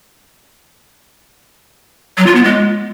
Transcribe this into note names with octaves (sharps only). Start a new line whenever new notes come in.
F#3
F4
B3
G#3